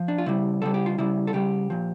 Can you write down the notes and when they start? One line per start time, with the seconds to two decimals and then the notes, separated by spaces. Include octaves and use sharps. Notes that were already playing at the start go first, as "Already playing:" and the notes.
Already playing: F3
0.08 D4
0.18 F4
0.26 C#3 G3 E4
0.62 C#3 G3 A4
0.74 G4
0.86 F4
0.98 C#3 G3 E4
1.27 A4
1.33 C#3 G3 G4
1.70 A#2 F3